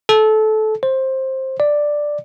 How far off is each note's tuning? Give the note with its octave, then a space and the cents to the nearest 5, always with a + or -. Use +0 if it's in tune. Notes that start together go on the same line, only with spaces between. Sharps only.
A4 -20
C5 +15
D5 +5